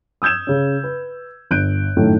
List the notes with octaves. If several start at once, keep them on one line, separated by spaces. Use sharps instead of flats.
D#6 E6 G6 G#6 E7
C#3 C#4
B4
G1 F#6 G6 D7
F#2 A2 D#3 A3